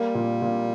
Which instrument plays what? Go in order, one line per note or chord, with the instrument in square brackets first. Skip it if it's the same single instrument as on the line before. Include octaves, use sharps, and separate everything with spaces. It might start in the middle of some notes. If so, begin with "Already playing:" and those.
Already playing: [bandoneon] G3 [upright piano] A#3
[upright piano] A#2
A#2